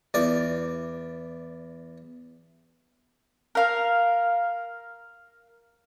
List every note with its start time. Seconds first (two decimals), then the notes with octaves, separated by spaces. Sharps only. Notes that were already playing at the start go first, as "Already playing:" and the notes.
0.14 E2 D5
3.55 A#4 F5